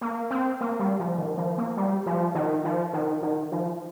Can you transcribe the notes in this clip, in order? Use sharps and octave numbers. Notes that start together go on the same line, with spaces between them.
A#3
C4
A#3
G3
F3
D#3
F3
A#3
G3
F3
D#3
F3
D#3
D#3
F3